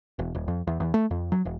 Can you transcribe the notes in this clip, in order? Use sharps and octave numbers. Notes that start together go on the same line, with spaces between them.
E1
D#1
F2
E2
E2
A3
F2
F#3
E1